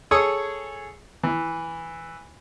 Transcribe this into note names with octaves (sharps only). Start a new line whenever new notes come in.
G#4 A4 C#5 C#6 D#6 E6
E3